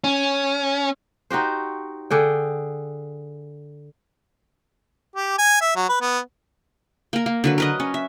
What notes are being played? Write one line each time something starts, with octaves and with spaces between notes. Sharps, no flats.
C#4
D#4 F#4 G4 C5
D3 G#4 G5
G4
G#5
E5
F#3
B4
B3
A#3 A#4
A#3
D3 F#3 B4
A#4 B4 D#5
C#4
E5